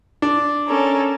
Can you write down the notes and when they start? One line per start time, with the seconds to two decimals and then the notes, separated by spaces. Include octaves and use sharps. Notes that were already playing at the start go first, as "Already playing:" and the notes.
0.22 D4
0.68 C#4 A4 A#4